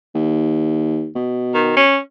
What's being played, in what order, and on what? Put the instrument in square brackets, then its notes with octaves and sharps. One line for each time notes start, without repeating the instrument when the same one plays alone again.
[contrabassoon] D#2
B2
[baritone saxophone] D#3
C#4